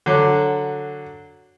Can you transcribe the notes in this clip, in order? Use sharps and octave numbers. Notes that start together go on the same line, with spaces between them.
D3 F#3